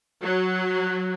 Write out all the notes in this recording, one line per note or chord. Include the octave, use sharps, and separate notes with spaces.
F#3